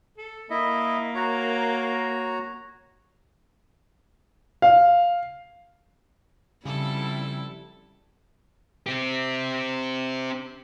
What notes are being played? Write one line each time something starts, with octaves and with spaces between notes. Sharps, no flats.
A4
A#3 E4 D#5 E5
F#4 C#5 A#5
F5
F2 C#3 G3 E4 A4
C4 G4